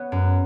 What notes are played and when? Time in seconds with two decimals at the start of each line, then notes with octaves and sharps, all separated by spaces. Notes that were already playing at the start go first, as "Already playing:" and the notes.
Already playing: B3 C#5
0.12 F#2